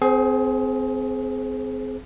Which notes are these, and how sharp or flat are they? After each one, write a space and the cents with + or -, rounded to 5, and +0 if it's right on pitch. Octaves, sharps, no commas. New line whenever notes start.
C4 -20 G#4 +25 C5 +25